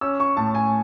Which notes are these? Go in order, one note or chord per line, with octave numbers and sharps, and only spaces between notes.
C#4 E6
C#6
A2 A5
G#5